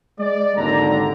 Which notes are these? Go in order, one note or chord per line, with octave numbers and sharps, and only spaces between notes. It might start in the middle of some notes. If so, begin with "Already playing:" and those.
G#3 D5
G#1 D#2 D3 A#5